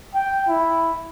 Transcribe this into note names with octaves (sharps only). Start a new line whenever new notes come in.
G5
E4